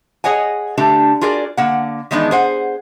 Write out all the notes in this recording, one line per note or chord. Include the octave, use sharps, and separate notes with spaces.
G#4 C#5 D#5 F#5 G#5
D3 A3 D4 G4
F4 F#4 G#4 A#4 D5
D3 A#3 F#5
D#3 E3 G#3 B3 D4 D#4
G#4 C5 F#5